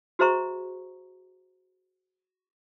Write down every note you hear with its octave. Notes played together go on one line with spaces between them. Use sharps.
F#4 G#4 C5 E5 A#5 C#6